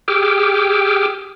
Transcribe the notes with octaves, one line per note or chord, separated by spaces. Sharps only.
G4 G#4 G5 D6 E6 F6